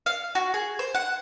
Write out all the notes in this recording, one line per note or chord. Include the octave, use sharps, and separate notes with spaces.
F5
F#4
G#4
C5
F#5